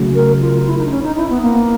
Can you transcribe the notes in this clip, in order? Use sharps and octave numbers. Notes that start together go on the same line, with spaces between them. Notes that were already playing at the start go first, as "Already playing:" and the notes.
Already playing: C#3 F#3 A3
A#4
F4
F4
E4
D#4
D4
C#4
D#4
E4
B3
A#3